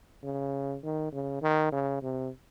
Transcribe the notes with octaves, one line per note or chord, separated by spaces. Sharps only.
C#3
D#3
C#3
D#3
C#3
C3